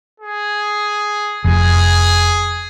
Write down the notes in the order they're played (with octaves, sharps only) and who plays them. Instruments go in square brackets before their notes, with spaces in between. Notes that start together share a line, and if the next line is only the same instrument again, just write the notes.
[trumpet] G#4
[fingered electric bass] F1 [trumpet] G#4